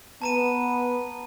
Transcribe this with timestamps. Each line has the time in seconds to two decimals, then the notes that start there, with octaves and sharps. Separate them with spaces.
0.22 B3 A5 A#5 D#7